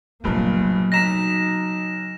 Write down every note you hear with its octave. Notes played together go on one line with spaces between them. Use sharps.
F1 G2 A#2 C#3 F3 F#3 A#3
B1 D#4 A#5 A#6 B6 E7